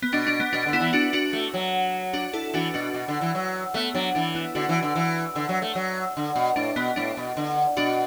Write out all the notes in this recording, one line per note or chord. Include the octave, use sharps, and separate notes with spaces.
B3
B2 D4
D4
B3
B2 D4
D3
B3 E4
E3
D4 F#4
D4 F#4
A3
F#3
D4 F#4
E4 A4
E3 D4 F#4
B2 D4 F#4
B2
D3
E3
F#3
A3 B3
F#3 D4
E3 D4
B3 E4
D3 D4 F#4
E3
D3
E3
D3
F#3
A3
F#3
D3
B2
A2 D4
B2 B3
A2 D4
B2
D3
B2 D4 F#4